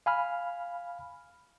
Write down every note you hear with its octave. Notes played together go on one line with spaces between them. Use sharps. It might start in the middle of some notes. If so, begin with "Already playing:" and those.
F5 G#5 B5 F6